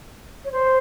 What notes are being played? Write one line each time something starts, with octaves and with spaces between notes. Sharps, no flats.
C#5
C5